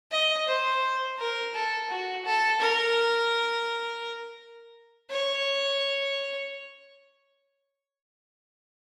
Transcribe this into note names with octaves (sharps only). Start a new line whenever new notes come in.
D#5
C5
A#4
A4
F#4
A4
A#4
C#5